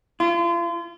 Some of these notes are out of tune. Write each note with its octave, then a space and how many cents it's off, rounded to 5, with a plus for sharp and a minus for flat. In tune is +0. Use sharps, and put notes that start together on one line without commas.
F4 -35